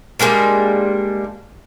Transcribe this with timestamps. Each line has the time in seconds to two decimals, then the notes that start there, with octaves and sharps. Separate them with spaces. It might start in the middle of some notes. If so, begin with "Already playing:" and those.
0.19 G3 G#3 A#3 D4